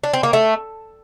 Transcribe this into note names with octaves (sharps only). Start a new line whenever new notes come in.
D4
C4
A#3
A3